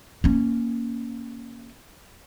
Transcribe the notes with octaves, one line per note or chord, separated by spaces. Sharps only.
A#3 C#4